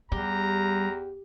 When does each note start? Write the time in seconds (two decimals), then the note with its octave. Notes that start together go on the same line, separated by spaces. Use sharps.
0.12 E2 G3 G4 A#5